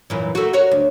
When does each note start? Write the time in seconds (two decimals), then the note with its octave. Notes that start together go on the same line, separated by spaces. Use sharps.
0.10 F#2 A#2 E3
0.35 A3 A#3 F#4
0.53 F#4 A#4 C#5
0.71 D2